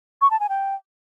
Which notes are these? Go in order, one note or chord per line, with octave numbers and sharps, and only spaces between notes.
C#6
A5
G#5
G5